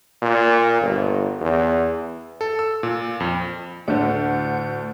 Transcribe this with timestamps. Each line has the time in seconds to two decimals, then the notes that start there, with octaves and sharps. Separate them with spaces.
0.22 A#2
0.81 G1
1.41 E2
2.41 A4
2.59 E6
2.83 A#2
3.20 F2
3.88 D2 A2 D3 F#5 G6